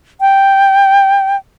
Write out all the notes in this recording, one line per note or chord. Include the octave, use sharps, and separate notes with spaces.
G5